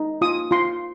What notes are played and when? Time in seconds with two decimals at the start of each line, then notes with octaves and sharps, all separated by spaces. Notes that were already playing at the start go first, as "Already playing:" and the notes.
Already playing: D#4
0.21 F4 D#6
0.51 F4 C6